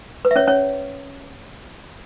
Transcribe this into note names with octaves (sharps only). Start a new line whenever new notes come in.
B4
E5
C#4 C#5
C#4 C#5